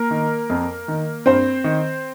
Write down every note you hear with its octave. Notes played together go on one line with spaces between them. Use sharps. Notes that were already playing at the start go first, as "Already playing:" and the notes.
Already playing: A#3 A#4
D#3
F2
D#3
G2 C4 C5
D#3